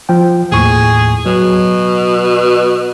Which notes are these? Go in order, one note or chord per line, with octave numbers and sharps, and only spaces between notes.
F3 G5
D#2 A2 G#4 C#6
B2 F#3